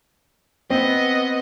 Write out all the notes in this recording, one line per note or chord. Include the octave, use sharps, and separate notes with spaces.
B3 C4 D#5